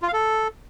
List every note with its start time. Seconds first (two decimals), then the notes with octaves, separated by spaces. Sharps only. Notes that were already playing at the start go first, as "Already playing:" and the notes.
0.02 F4
0.08 F5
0.13 A4